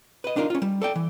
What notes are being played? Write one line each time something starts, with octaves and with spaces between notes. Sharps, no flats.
B4 D#5
D4 D#4 F4 A#4
C#4 F4
G3
A4 D5 G5
E3